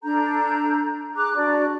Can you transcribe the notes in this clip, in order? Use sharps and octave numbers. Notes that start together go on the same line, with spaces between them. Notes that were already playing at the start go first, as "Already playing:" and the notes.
D4 A4 A#5 G6
G#4 A#5 D6 F#6
D4 F#4 D5